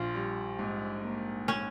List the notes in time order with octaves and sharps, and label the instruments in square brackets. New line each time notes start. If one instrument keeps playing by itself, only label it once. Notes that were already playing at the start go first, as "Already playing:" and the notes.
Already playing: [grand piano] A#1 [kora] F4
[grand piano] G3
G#2
A#3
[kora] C#4